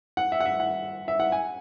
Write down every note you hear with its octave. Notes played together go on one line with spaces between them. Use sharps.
F#5
E5
F#5
E5
F#5
E5
F#5
G#5